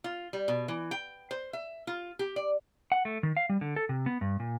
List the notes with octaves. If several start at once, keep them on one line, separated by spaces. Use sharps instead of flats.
F4
G3
B2
E3
G5
C5
E5
F4
G4
D5
F#5
A3
D#3
F5
G3
D3
A4
C3
B3
G2
A#2